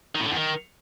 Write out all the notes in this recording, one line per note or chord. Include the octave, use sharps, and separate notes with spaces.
D#3
A2
D3
E2
D#3